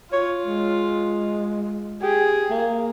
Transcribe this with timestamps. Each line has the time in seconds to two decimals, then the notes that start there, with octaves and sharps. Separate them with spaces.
0.13 F4 C#5
0.46 G#3
2.02 G4 G#4
2.50 A#3